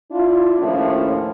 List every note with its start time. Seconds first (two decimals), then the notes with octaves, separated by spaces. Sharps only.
0.11 D4 E4 F4
0.60 D#2 A2 F3 C#4